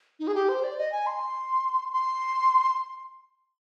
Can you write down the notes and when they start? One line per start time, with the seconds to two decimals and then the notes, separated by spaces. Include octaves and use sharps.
0.20 D#4
0.27 G#4
0.35 G4
0.49 C5
0.64 D5
0.78 D#5
0.92 G#5
1.06 C6
1.92 C6